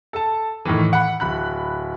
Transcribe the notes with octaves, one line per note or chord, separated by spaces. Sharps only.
A4 A5
A2 D#3 E3
F#5 B5
D1 B5 F#6